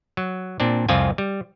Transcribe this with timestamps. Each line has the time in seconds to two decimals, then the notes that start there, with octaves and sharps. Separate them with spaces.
0.17 F#3
0.60 A#2 C4 D4
0.89 C2 F2 F3 C4 F4 G#5
1.18 G3